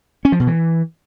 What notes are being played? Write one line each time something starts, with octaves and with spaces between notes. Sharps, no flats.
C#4
F3
B2
E3